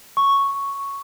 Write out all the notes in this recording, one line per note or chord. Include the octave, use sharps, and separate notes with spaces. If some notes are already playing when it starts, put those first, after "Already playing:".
C#6